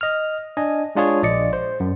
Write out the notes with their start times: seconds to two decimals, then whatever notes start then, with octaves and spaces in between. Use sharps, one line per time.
0.01 D#5 F6
0.57 D4 D#5 G#5
0.95 G#3 D4 F4 G#4 C#5
1.23 A#1 D5 D#5 C#7
1.53 C5
1.80 F#2